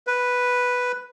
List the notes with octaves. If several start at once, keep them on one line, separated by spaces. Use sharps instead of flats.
B4